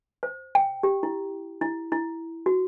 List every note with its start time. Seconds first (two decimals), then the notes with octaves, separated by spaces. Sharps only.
0.23 C5
0.55 G5
0.83 G4
1.03 E4
1.61 E4
1.92 E4
2.46 F#4